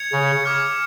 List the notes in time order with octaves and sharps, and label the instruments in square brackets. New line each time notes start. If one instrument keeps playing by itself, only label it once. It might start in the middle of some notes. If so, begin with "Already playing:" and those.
Already playing: [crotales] G#6 C#7 F7
[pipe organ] C#3
[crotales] D6 F6 G#6